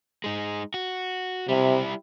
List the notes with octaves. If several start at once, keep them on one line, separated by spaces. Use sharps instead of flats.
G#3 D#4
F#4
C3 G3 E4